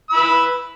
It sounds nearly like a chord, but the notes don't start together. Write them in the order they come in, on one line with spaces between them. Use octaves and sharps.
E6 B5 B4